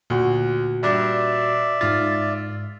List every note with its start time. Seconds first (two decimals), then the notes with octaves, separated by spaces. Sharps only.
0.10 D2 A#2 F#4
0.83 G2 D4 D5 E5
1.81 G#2 F4 A6